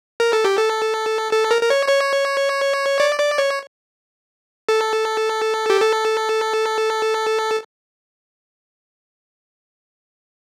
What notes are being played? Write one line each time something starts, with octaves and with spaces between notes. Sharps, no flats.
A#4
A4
G4
A4
A4
A#4
A#4
C#5
C#5
D5
D5
C#5
A4
G4
A4